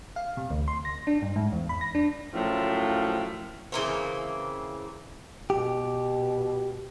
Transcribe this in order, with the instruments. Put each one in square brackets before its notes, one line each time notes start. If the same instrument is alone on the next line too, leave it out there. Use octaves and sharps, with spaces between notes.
[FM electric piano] F5
C3
D2
C6
A#6
D4
G2
G#2
E2
B5
A#6
D4
[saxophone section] F#2 A2 F3
[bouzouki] C#3 E3 A#3 C4
[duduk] B2 [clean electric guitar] G4